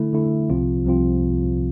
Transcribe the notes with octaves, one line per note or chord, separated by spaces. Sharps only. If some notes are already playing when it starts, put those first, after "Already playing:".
Already playing: D3 A3 E4
D3 A3 E4
C2 C3 F3 C4 F4
C2 C3 F3 C4 F4